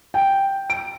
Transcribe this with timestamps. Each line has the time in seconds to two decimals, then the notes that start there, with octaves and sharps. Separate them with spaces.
0.14 G5
0.70 D7